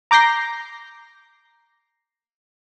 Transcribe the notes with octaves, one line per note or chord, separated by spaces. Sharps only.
A#5 D6 G6 A#6 C7